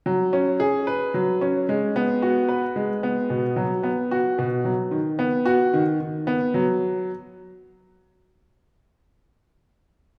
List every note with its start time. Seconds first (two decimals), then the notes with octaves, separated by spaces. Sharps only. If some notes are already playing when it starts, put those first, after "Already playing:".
0.06 F#3
0.33 C#4
0.60 G#4
0.87 B4
1.14 F#3
1.41 C#4
1.69 G#3
1.96 B3
2.22 F#4
2.49 B4
2.76 G#3
3.03 B3
3.30 B2
3.56 F#3
3.83 B3
4.11 F#4
4.39 B2
4.65 F#3
4.91 D#3
5.19 B3
5.46 F#4
5.73 D#3
6.00 D#3
6.27 B3
6.54 F#3